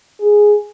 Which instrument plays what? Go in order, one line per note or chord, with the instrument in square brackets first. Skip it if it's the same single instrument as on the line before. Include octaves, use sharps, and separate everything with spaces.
[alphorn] G#4